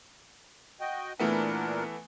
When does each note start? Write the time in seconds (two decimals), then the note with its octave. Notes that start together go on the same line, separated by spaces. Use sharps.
0.81 F#4 D#5 G5
1.20 A#2 E3 A3 B3 D4 A#4